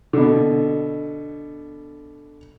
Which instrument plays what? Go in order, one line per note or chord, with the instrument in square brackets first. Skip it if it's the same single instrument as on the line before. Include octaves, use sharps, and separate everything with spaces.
[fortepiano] B2 D3